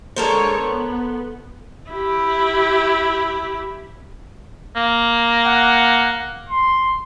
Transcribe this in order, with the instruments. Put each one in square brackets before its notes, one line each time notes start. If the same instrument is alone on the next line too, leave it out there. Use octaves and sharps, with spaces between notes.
[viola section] D3 G#3 C#5 [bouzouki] A4 A#4 C5
[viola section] B3
[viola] E4 G4
[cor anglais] A#3
[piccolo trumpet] F#5
C6